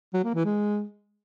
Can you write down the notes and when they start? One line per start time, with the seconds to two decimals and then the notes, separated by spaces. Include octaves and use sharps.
0.14 F#3
0.24 A#3
0.34 E3
0.45 G#3